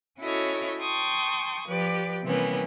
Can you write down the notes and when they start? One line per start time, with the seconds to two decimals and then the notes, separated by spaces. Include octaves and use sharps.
0.20 C#4 E4 F#4 A4 C#5 D#5
0.80 G5 A5 C6 C#6 D#6
1.67 F3 G4 B4 D5
2.24 C3 E3 G3 A#3 B3 C#4